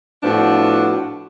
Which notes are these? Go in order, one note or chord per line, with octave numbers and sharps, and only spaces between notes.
A2 F3 B3 D4 F#4